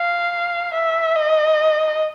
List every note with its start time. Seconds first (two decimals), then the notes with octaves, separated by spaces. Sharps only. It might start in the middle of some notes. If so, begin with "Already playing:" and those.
Already playing: F5
0.74 E5
1.15 D#5